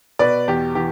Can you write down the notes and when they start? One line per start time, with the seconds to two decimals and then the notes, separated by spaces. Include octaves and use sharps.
0.19 B2 B4 D5
0.48 E2 G4
0.75 E3 G4